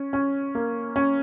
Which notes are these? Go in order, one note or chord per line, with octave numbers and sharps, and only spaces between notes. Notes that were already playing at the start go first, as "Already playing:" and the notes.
Already playing: C#4
C#4
A#3
C#4